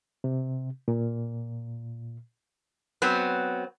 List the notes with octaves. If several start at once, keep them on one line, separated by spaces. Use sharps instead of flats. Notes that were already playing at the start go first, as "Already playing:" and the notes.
C3
A#2
F#3 B3 C4